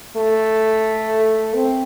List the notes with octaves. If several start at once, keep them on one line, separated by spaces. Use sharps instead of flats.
A3
C4